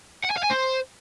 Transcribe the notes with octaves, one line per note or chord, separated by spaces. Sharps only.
F#5
G#5
F5
G#5
C5